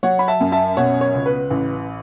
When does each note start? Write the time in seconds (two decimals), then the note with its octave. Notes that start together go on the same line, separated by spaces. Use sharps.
0.03 F#3 C#5 F#5
0.19 B5
0.28 E5 A5
0.40 F#2
0.52 E5 A5
0.77 B2 C#5 F#5
1.01 C#5
1.14 C#2
1.26 B4
1.50 A1